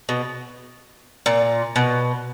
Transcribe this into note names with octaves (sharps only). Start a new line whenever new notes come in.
B2
A#2
B2